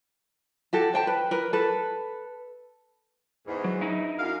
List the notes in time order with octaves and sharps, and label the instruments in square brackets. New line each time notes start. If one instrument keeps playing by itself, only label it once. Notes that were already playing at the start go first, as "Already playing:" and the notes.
[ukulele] F#4 G4 A4
C5 G5 A5
B4
A#4 B4
A4 B4
[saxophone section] E2 G#2
[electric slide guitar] F#3
D#4 E4
[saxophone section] F#2 F5